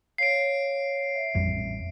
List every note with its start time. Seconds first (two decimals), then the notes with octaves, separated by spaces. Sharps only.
0.18 C#5 F5 C7 D7
1.15 E5
1.35 A1 F2 G3